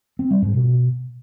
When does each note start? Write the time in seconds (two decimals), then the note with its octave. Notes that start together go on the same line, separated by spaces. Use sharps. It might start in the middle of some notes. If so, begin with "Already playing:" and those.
0.19 C4
0.31 G3
0.42 G#2
0.54 B2